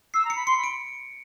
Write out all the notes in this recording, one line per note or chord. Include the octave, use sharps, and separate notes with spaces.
E6 C7
A#5
C#7
B5
C6 C#7
B5
D7